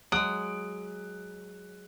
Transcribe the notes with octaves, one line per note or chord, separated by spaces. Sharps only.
F#3 G#3 D#6 F#6 D7